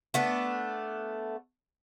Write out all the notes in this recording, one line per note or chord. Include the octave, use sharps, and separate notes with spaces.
A3 B3 D4